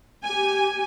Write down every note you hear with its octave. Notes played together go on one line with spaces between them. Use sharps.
G4 G#5